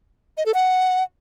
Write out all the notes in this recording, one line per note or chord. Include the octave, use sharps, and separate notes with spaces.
D#5
A4
F#5